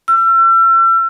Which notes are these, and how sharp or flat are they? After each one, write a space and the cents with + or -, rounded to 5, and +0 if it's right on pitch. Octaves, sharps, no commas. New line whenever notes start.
E6 +40